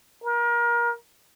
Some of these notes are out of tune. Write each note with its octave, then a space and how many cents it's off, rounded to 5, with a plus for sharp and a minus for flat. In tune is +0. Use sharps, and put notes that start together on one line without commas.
A#4 +30